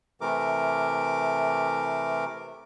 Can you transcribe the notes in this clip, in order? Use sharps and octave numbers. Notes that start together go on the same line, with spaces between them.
C3 E3 A3 A#4 D6